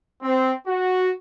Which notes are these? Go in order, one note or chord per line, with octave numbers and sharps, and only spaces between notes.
C4
F#4